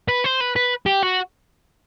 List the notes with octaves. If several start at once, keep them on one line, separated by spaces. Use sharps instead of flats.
B4
C5
B4
B4
G4
F#4